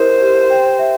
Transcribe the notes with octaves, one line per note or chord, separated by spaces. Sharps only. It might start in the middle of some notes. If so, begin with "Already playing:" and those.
Already playing: E4 G4 A#4 C5 D#5
G4
G5
E5